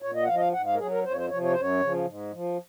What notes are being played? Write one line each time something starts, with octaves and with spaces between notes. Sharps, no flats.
A#2 C#5
D#5
F#5
F3 F5
D#5
F5
G#2 F#5
F5
A#4
F#3 G#4
A#4
F2 C5
C#5
C5
C3 F3 C#5
C#5
F#2 C5
C#5
C#3 F3
G#2
F3